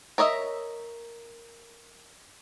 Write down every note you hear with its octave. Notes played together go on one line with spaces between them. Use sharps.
A#4 C#5 D#5 E5